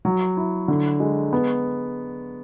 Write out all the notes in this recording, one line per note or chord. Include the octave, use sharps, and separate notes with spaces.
F#3
E4
D3
G#3
B3